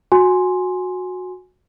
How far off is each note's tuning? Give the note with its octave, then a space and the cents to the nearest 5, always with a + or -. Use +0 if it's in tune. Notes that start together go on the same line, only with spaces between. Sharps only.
F#4 -15 G#5 +0 C6 +5